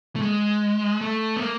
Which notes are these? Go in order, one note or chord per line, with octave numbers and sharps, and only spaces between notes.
A3
G#3
A3
B3
A#3